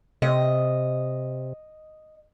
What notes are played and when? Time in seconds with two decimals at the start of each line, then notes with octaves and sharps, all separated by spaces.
0.22 C3 D#5